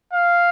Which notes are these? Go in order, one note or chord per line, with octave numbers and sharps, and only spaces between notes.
F5